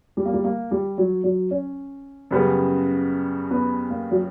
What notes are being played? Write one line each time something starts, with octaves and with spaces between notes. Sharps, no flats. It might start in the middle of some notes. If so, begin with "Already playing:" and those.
G3
A#3
G3
A#3
G3
F#3
F#3
C#4
F#2 C#3 G3 B3
B3
A#3
F#3